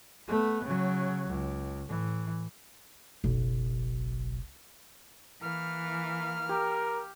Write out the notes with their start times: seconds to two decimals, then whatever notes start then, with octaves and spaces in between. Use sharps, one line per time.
0.28 A3 B3
0.64 C#3 F#3
1.29 C#2
1.89 A2 E3
3.24 F#1 B1
5.42 E3 A#3 F6
6.49 G4 A#4